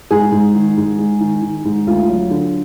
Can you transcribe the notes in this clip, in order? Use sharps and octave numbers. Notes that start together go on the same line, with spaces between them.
G#2 G#4
G#2
D#3
G#2
G#2
D#3
D#3
G#2
D2 F4
F#3
D3